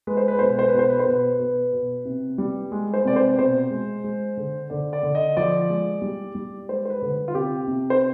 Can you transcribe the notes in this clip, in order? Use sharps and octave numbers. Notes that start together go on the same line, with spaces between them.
G#3 B4
C5
B4
B2 C5
B4
C5
B4
B2 C5
B4
C5
B2 B4
B2 B4
B2
C3
G3
G#3
C5
C3 D5
C5
B2 C5
G#3
G#3
D3
D3 D5
D5
D3
D#5
F3 D5
G#3
G3
G3
G#3 C5
C5
B4
D3
F4
C3 G4
C3
C5